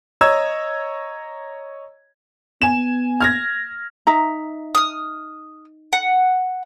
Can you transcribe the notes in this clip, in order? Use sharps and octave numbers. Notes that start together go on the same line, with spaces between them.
C#5 D#5 A#5 E6 G#6
B3 G#5 E7
F6 G#6 A#6
D#4 E5 A#5
D#6 F6
F#5